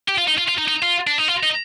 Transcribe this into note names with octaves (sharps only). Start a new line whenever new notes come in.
G4
F4
D#4
F4
F4
D#4
D#4
F4
D4
D#4
F4
D#4